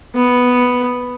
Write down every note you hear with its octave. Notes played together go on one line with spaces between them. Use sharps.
B3